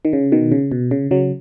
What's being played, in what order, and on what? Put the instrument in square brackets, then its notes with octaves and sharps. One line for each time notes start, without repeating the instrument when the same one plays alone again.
[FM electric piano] D#3
C#3
B2 D#3
C#3
B2
C#3
C#3 F#3